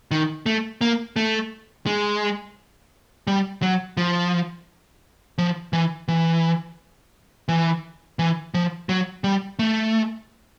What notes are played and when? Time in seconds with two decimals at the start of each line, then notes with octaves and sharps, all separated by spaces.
0.11 D#3
0.46 A3
0.81 A#3
1.16 A3
1.86 G#3
3.27 G3
3.62 F#3
3.97 F3
5.38 F3
5.73 E3
6.08 E3
7.48 E3
8.19 E3
8.54 F3
8.89 F#3
9.24 G3
9.59 A3